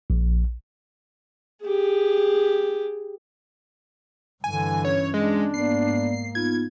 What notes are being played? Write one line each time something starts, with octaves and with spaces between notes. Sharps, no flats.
A#1
G4 G#4
G2 D3 E3 G#5
C#4 C#5
G#3 D4
G#2 A#3 B3 D5 C7
B3 D#4 F4 G#6